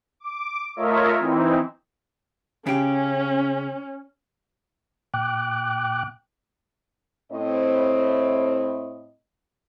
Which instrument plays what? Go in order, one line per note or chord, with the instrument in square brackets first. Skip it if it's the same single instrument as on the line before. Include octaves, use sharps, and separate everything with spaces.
[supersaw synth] D6
A3 F4 A#4 C#5 D#5 E5
E3 C4 D#4 E4
[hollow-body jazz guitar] C#3 G4 [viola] C#4
[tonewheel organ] A#2 G5 D6 F#6
[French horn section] A2 C4 D#5